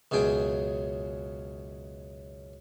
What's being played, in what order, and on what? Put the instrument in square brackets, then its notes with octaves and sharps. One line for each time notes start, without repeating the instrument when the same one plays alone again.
[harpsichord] C#2 F#2 B2 G#4 G5